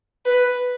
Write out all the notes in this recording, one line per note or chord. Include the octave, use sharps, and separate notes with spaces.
B4